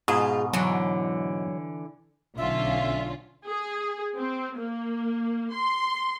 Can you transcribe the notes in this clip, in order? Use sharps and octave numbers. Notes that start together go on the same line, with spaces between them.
G#2 B2 F4 G#4
D3 E3 F#3
B1 D3 C#4 F4 E5
G#4
C4
A#3
C6